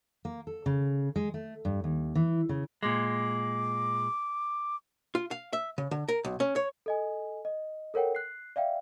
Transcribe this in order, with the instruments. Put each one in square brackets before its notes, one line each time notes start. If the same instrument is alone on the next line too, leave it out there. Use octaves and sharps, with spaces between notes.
[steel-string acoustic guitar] A#3
A4
C#3
G#3
A3
G2
D#2
E3
C#3
[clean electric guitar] A#2 G#3 [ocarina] D6
[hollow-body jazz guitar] F4
F5
E5
C#3
D3
A#4
B1
C#4
C#5
[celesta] A4 D#5 G#5
D#5
A4 A#4 C#5 F#5 G5
F#6 C7
D5 E5 F5 G5